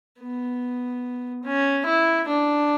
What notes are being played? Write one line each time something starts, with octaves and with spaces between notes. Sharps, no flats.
B3
C#4
E4
D4